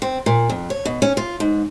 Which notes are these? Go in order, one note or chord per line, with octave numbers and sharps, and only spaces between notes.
C4
A#2
F2
C#5
B2
C#4
F4
G#2